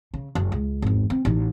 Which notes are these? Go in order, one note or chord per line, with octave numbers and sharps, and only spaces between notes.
C#3
F#1
C#2
G#1 E2
C4
A1 D#4